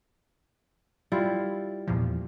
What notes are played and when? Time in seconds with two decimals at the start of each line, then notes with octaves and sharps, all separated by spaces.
1.12 G3 E4 F4
1.87 E2 A#2 F3